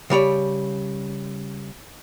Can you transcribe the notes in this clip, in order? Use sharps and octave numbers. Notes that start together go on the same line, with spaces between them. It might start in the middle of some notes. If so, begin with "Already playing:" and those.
C#3 G3 C#5 D5